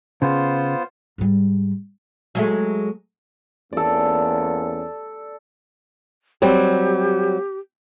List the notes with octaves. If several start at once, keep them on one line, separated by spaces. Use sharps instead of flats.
C#3 B3 F4 C5
G#2 G3
F#3 G#3 A3
E2 A#3 C#4 A4 D5
F#3 G3 C4 G4